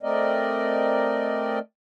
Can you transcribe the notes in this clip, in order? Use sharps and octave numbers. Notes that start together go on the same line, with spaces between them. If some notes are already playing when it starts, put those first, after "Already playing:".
A3 C4 A#4 D5 D#5